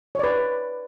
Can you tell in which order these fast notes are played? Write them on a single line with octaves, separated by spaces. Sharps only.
C#5 D5 B4